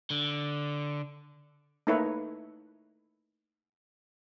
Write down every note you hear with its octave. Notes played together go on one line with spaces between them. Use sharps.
D3
A3 A#3 D#4 E4 B4 C#5